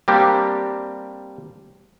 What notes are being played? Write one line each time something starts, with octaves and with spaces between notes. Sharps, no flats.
G3 A#3 C4 D4 G4